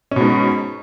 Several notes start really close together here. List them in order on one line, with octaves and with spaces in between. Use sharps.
C#4 B2 G#2